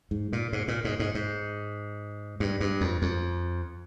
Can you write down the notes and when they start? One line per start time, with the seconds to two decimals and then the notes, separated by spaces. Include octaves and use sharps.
0.11 G#2
0.33 A#2
0.53 G#2
0.68 A#2
0.85 G#2
0.99 G#2
1.15 G#2
2.40 G2
2.60 G2
2.81 F2
3.02 F2